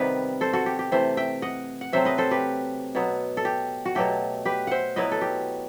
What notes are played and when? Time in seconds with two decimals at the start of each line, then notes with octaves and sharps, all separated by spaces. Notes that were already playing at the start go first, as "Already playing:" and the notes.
Already playing: C3 D#3 G3 B3 G4 B4
0.41 A4 C5
0.53 F#4 A4
0.66 G4
0.79 G4
0.92 C3 E3 A3 C5 E5
1.17 E5 G5
1.42 D#5 F#5
1.81 F#5
1.93 C3 F#3 A3 C4 C5 E5
2.05 B4 D#5
2.18 A4 C5
2.31 G4 B4
2.95 B2 F#3 B3
3.37 A4
3.45 G4
3.85 F#4
3.95 B2 F#3 A3 G4
4.45 G4 B4
4.67 C5 E5 F#5
4.96 B2 F#3 B3 E4 B4 D#5
5.12 A4
5.21 G4